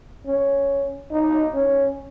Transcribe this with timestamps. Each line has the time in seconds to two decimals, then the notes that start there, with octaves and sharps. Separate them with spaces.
0.26 C#4
1.11 D#4
1.54 C#4